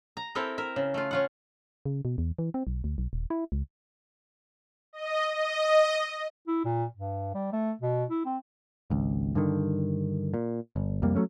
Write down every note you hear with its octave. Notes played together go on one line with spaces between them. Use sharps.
A#5
C4 E4 A4 A#4 G5
A#4 E5
C#3
A3 F4
C#4 F4 F#5
C#3
B2
E2
E3
C4
B1
D2
B1
D#1
E4
C#2
D#5
D#5
E4
A#2
G2
G3
A3
B2
E4
C4
G#1 C#2
G2 D3 D#3
A#2
G1
C2 F2 G3 A#3
F#3 G3 A3 C#4